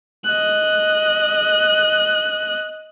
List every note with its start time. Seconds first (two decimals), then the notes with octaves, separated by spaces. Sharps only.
0.25 D#5 F#6